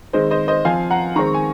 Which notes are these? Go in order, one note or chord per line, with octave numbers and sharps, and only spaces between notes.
D#3 G#3 C4 C5 D#5
C5 D#5
C5 D#5
F3 C4 F5 G#5
F#5 A#5
D#3 G#3 C4 A#5 C#6
G#5